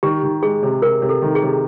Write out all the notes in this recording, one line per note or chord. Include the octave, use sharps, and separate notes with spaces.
D#3 G4
D#3
G#3 G#4
C3
C3 A#4
C3
A4
D#3
G#4
C3